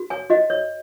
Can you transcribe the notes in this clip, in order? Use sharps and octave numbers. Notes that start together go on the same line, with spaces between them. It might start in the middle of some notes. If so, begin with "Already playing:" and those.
Already playing: F#4
C#5 G#5
F#4 D#5
C#5